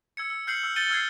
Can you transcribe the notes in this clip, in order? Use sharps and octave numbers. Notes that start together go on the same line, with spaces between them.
E6 G#6 C#7
E6
F6 G6 C7 C#7 F#7
E6
G6 A6 C#7 D#7 G7
E6 F6 G#6 C7